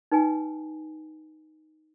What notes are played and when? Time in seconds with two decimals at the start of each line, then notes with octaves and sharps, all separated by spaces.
0.11 D#4 B4 G5 G#5